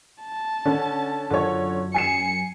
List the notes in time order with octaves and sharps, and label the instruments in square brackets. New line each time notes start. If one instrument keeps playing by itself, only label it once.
[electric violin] A5
[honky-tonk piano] D3 C#4
[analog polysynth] F#2 [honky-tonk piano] D3 F4 C#5
[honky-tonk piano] G#5 C7 E7 [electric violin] C#7